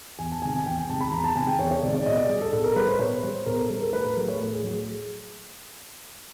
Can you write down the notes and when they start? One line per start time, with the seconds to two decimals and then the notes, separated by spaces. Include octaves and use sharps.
0.19 E2 G#5
0.32 A5
0.42 C3 D#3 G#3 G#5
0.56 G#5
0.66 E2 G5
0.78 G5
0.89 C3 D#3 G#3 A5
1.01 B5
1.12 E2 A#5
1.24 A5
1.36 C3 D#3 G#3 G#5
1.47 G5
1.59 E2 C#5
1.71 C#5
1.82 C3 D#3 G#3 D5
1.95 D5
2.06 B2 D#5
2.17 D5
2.29 G3 G#4
2.41 A4
2.53 B2 A4
2.64 A#4
2.76 G3 B4
2.88 C5
2.99 B2 C#5
3.23 G3 C5
3.46 B2 A#4
3.58 A4
3.69 G3 A#4
3.81 A#4
3.93 A2 B4
4.04 A#4
4.16 F#3 A3 A4
4.28 C#5
4.40 A2
4.52 G#4
4.63 F#3 A3 G#4